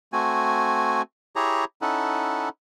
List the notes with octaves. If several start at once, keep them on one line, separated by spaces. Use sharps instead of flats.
A3 C4 F#4 G#5
E4 G4 G#4 C#5 A#5
C#4 D#4 E4 A4 F#5